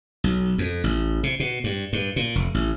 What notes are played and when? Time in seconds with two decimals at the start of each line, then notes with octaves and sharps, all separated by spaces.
0.24 B1
0.58 F2
0.84 A1
1.23 C3
1.40 B2
1.64 G2
1.93 G2
2.16 A#2
2.35 F1
2.54 A1